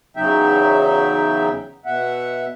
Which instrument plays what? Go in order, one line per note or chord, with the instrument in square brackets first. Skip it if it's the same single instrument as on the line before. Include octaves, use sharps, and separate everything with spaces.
[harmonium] E2 C#3 F#3 D#4 E5 G5
B2 E5 F#5